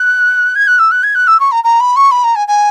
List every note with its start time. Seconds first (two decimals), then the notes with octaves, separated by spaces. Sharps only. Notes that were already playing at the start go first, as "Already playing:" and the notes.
Already playing: F#6
0.55 G#6
0.67 F#6
0.79 E6
0.91 F#6
1.03 G#6
1.15 F#6
1.27 E6
1.40 C#6
1.51 A#5
1.64 A#5
1.80 B5
1.96 C#6
2.11 B5
2.24 A#5
2.35 G#5
2.48 G#5